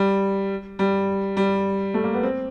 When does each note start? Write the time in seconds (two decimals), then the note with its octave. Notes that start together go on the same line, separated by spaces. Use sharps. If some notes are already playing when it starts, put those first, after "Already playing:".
Already playing: G3
0.79 G3
1.37 G3
1.94 A3
2.04 A#3
2.14 B3
2.23 C4